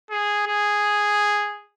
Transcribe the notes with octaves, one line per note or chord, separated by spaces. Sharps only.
G#4
G#4